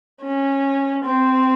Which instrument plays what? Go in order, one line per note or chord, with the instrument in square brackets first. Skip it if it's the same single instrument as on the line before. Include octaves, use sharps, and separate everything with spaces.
[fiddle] C#4
C4